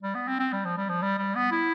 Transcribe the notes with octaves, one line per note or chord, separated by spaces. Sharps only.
G3
B3
C4
C4
G3
F3
G3
F3
G3
G3
B3
E4